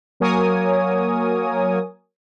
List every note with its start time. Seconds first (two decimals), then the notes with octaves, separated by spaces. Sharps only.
0.20 F#3 A#3 A#4 C#5 G#5 D#6